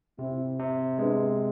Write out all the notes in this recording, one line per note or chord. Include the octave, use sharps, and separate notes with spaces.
C3 C4 E4
C3
G#3 B3 D4